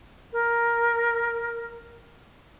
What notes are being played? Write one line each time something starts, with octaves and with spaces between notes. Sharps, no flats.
A#4